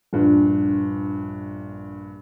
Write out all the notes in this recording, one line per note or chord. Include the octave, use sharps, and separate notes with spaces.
A#1 G2